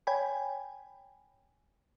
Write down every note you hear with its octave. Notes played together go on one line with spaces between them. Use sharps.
C#5 G5 G#5 B5